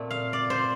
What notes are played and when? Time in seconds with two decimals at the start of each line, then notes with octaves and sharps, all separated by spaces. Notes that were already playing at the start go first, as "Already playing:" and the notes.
Already playing: A#2 A3 C4
0.11 F5
0.33 D5
0.50 C5